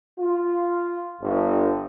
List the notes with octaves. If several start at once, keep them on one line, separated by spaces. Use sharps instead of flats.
F4
G1